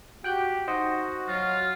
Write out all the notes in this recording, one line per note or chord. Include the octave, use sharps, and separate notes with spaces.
F#4 G4 G5 F#6 G6
D#4 F#4 C5 D#5 F#5
F#3 F4